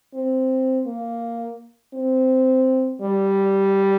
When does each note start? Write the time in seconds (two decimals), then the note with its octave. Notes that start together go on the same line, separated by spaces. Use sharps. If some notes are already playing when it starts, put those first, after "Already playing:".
0.14 C4
0.86 A#3
1.94 C4
3.02 G3